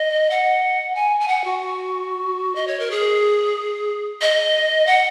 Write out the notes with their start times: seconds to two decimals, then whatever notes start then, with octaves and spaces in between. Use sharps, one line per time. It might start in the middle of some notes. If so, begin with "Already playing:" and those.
Already playing: D#5
0.30 F#5
0.95 G#5
1.20 G#5
1.28 F#5
1.44 F#4
2.55 D#5
2.67 C#5
2.79 A#4
2.91 G#4
4.22 D#5
4.87 F#5